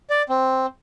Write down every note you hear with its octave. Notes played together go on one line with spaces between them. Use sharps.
D5
C4